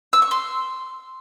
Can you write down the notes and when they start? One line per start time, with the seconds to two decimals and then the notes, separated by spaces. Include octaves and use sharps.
0.13 E6
0.22 C#6
0.31 C6